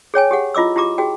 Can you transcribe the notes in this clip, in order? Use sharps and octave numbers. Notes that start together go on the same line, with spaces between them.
G#4 C#5 G5 G#5
G4 G#4 F#5
E4 F4 D#5 D6 E6
E4 F4 G4 A#5 D6
F#4 G#4 G5